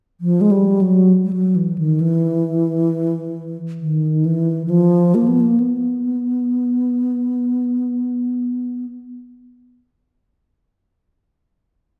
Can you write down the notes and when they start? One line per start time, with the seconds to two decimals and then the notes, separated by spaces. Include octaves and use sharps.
0.21 F3
0.41 G#3
0.51 G3
0.81 F#3
1.24 G3
1.33 F#3
1.56 E3
1.78 D#3
2.00 E3
3.80 D#3
4.25 E3
4.66 E3
4.70 F3
5.15 A#3
5.27 B3
5.40 A#3
5.60 B3